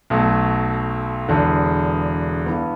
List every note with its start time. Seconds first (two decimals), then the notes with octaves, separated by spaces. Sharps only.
0.10 B1 B2 F#3 A3
1.29 E1 E2 D3
2.46 G2 E3 B3